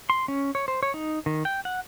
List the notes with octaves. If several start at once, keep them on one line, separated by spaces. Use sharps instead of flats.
C6
C#4
C#5
C5
C#5
D#4
D#3
G5
F#5